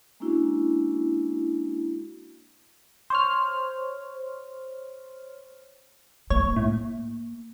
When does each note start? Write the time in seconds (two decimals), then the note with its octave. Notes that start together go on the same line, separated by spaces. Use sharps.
0.20 G#3 A#3 C#4 D4 E4 F#4
3.10 C5 C#5 F6
6.30 A#3 C#5
6.56 A2